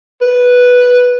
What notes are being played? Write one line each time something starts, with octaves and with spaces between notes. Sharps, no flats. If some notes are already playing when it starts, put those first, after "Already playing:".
B4